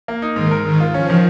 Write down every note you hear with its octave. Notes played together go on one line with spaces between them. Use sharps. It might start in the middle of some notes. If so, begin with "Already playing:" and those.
A#3
D#4
G#2 D#3
A#4
G#2 D#3
F4
F3 C#4
D#3